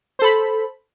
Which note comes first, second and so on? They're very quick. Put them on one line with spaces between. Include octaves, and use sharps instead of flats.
C5 A4 B5